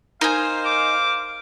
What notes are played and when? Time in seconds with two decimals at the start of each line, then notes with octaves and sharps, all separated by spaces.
0.21 D#4 A#4 C5 F5 G#5
0.65 D6